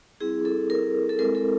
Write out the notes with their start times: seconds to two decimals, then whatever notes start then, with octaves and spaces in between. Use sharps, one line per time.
0.20 G3 C4 E4 G#4
0.45 A4
0.70 A#4
1.09 A4
1.19 G#3 C4 E4 A#4
1.35 A4